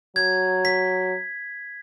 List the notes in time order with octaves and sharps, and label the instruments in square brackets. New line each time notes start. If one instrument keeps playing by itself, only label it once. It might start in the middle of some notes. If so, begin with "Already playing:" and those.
[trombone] F#3 [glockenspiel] G#6
[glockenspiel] B6